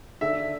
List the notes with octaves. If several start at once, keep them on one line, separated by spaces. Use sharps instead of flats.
D3 E5